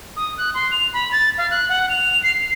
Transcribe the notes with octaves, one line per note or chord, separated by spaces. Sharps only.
D#6
F#6
C6
F7
B5
A6
F5
F#6
F#5
F7
C7